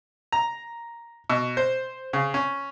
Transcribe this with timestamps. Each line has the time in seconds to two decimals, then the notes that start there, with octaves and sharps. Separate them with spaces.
0.33 A#5
1.30 B2
1.57 C5
2.13 C#3
2.34 C#4